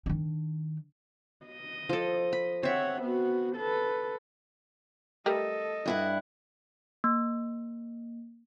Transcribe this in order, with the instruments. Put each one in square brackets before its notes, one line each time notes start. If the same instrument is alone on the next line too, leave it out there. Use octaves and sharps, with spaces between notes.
[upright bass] D#3 D4
[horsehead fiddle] D#5
[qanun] F3 A4
B5
[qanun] C4 E5 [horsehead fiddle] C#5 F#5
[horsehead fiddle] B3 F#4
A4 B4
[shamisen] G3 A3 A#4 [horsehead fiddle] A4 D#5
[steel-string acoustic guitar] G2 E4 F#5
[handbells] A#3